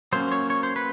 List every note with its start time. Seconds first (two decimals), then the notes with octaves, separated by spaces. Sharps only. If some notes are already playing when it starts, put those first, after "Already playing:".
0.13 F#3 A#3 C#4 C5
0.32 C#5
0.50 C#5
0.63 C5
0.76 B4